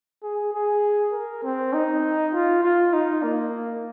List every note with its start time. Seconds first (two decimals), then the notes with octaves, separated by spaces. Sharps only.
0.23 G#4
0.53 G#4
1.13 A#4
1.43 C4
1.73 D#4
2.33 F4
2.63 F4
2.93 D#4
3.23 A#3